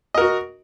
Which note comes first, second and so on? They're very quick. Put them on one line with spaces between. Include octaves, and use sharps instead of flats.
D#5 A#4 F#4